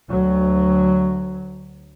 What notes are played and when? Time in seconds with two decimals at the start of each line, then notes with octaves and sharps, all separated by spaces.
0.10 D2 F#3